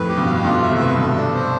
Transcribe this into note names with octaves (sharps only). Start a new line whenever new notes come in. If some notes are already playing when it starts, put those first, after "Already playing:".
Already playing: F2 A2 B4
G4
G2 B2
F5
G2 B2 F4
E5
A2 C3
B4
G2 B2 A4
D4
C5